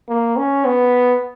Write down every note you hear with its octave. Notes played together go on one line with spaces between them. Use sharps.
A#3
C#4
B3